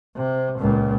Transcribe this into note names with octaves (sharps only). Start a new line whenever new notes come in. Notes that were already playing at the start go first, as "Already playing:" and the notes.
C3
C#2 A#2